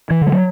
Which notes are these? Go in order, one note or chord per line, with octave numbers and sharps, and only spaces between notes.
E3
D3
G3
F#3